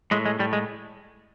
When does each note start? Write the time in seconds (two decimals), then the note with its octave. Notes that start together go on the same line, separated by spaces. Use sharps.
0.11 A2 G#3
0.25 G#3
0.39 A2 G3
0.53 G#3